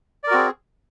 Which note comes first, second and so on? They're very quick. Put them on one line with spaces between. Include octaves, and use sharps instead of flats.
D5 A#4 F#4 C4 G#4